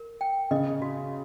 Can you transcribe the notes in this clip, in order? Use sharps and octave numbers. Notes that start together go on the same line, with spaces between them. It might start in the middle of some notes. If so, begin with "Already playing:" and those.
Already playing: A#4
G5
C#3 D#5
F#4